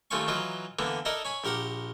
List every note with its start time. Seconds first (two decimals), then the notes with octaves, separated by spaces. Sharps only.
0.11 D#2 A3 C4 F4 G#5 C#6
0.28 E3 F#3 D#4 F4 B4
0.79 D3 E3 A#3 B3
1.05 D#4 E4 A4 A#4 D5 D#5
1.25 C#5 G#5 B5
1.44 A#1 G4 A#4 F#5 D6